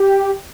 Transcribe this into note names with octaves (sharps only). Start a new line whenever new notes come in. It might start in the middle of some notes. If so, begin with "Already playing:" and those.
Already playing: G4